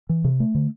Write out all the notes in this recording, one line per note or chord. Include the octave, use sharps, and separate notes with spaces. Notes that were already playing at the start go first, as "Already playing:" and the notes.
E3
C3
A3
D3